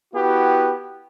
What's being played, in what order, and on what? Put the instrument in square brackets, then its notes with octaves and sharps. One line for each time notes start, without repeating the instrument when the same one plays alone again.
[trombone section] B3 E4 F#4 G4